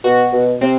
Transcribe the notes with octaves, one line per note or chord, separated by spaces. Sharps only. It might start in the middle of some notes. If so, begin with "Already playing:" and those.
B2 F#4
B2
C3 C4